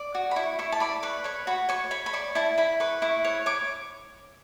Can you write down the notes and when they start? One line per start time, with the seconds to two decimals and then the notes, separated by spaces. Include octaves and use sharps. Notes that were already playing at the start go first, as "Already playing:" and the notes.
Already playing: D5
0.15 F#4
0.31 B5
0.36 E4 C#6
0.59 E4 C#6
0.72 A5
0.80 D5 B5
1.03 B4 C#6
1.24 C#5 C#6
1.47 F#4 B5
1.69 C#5 C#6
1.91 C#5 B5
2.06 B5
2.13 D5 C#6
2.35 E4 A5
2.58 E4 B5
2.80 B4 C#6
3.02 E4 C#6
3.25 C#5
3.46 C#5 D6